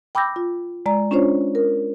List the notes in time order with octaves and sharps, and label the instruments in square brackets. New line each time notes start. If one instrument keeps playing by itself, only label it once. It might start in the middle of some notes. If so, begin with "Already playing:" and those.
[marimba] G5 B5 D6 E6 G6 A#6
F4
G#3 D5 A#5
C#4 D4 F4 C5 C#5
A#4